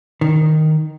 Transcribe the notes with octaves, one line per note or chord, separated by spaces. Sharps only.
D#3